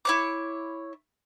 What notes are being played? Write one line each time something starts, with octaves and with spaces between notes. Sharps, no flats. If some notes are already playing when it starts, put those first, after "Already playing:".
E4 C#5 D6